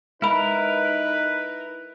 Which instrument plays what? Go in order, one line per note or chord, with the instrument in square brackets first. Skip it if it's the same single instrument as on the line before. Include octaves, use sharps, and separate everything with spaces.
[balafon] G#3 B5 [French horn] D#4 [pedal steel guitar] E4 A#4 [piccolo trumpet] B4